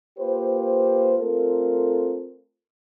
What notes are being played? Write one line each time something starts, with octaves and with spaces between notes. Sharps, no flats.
A#3 F4 G4 B4 C5
A3 C4 F4 A4 A#4